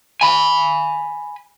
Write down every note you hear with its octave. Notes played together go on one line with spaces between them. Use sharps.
G#5 B5